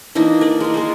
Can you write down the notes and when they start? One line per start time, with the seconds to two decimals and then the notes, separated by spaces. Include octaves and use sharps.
0.15 E3 A#3 D4 D#4
0.41 A#4 D5
0.60 G#3 F4
0.74 G#3 A#3